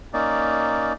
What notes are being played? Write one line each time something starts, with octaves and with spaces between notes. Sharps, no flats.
A#3 C#4 D#4 D5